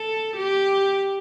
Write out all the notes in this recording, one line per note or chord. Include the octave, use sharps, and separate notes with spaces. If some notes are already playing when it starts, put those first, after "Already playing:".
Already playing: A4
G4